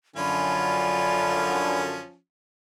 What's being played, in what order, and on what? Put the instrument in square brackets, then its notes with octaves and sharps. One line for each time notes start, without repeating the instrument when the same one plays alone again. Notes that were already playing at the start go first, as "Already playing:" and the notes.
[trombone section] F#2 D3 [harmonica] F3 C#4 F4 [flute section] D5 G#5 B5